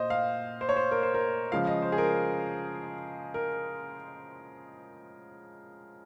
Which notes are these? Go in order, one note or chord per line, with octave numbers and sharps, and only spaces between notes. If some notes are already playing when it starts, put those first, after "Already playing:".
Already playing: A#2 C5 D#5
F5
C5
C#5
C5
A#4
C5
A#4
C#3 F3 G#3 F5
D#5
C5
G#4
A#4
A#4